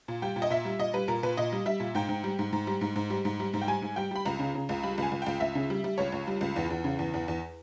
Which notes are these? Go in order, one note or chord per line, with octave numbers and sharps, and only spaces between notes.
A#2
G3 G5
A#2
D#5
A#2 E5
G3
A#2 D#5
G3 B4
A#2 A#4
A#2 B4
A#2 D#5
G3
G3 E5
A#2
G#2 G5
G#2
G3
G#2
G#2
G3
G#2
G#2
G3
G#2
G3
G#2
G5
G3 G#5
G#2
G3 G5
G3 B5
C#2 A#5
C#3
C#3
C#2
G3 B5
C#2
G#5
C#2
C#2 G5
C#2 E5
C#3
G3
G3
C#2 C#5
C#2
G3
C#2
E2
E2
C#3
E2
E2
E2